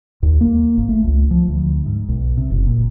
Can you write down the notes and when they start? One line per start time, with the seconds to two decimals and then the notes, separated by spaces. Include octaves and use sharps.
0.23 D#2
0.41 A#3
0.77 G#1
0.89 A3
1.04 C#2
1.31 F3
1.48 D2
1.86 G#2
2.08 B1
2.37 C3
2.50 F#1
2.66 A#2